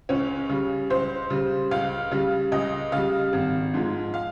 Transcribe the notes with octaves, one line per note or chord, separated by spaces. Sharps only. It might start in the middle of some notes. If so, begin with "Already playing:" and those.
C#2 C#4
C#3 G3
C#2 C5
C#3 G3
C#2 F5
C#3 G3
C#2 D#5
C#3 G3 F5
G#1
G#2 F3 G#3
F5